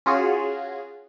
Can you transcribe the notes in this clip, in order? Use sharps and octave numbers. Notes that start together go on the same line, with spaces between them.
C#4 F4 F#4 G#4